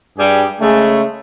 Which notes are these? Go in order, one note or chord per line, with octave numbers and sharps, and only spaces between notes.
G2 G3 G4 G#4
C#3 G#3 A3